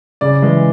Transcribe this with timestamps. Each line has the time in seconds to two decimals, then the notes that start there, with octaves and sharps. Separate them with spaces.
0.21 C#3 D5
0.42 E3 G#3